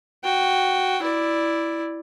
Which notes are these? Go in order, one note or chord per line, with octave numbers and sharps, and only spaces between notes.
F#4 G5
E4 D5